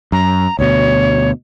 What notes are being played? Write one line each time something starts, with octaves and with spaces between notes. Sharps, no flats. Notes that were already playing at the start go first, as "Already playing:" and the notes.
F#2 A#5
D2 B2 C#5